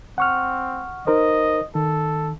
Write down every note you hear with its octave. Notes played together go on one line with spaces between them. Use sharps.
C4 F#5 C#6 F6
D#4 A#4 C5 D#5
D#3 A4